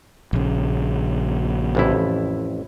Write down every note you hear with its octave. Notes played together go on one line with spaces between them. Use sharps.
A#1 C#3
A1 F2 E4